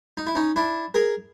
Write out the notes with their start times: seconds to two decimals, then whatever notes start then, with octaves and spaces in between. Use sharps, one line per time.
0.17 D#4
0.27 E4
0.35 C#4 D#4
0.56 D4 E4
0.94 G#4 A#4